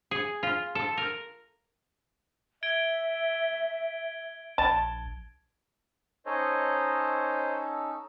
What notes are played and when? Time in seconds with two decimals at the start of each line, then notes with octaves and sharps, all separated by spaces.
0.11 G#4
0.43 F4
0.75 A4
0.97 A#4
2.63 E5 G#6 D7 G7
4.58 A#1 A5
6.26 C#4 D#4 A4 C5 C#5 D#5